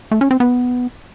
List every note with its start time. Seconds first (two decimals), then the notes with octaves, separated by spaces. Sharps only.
0.11 A3
0.21 C#4
0.31 C4
0.40 B3